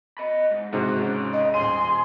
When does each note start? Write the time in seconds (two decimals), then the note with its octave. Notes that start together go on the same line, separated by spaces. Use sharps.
0.18 D#5 B5
0.51 G#2
0.73 G#2 C3 G#3 F#4
0.99 C#3 C#4
1.33 D#5
1.54 D#1 G#4 C6 D#7